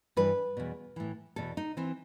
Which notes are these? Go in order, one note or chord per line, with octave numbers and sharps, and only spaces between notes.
G2 E3 B4
E2 B2
A2 E3
E2 B2 A4
D#4
E3 C4